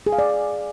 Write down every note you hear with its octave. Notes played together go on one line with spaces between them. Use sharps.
G#4
F5
D5